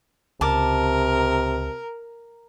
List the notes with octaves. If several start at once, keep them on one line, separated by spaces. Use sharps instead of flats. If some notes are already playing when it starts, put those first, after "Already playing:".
C#2 C3 A#4 A5 D6